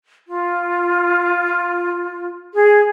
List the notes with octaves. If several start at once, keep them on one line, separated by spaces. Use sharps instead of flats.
F4
G#4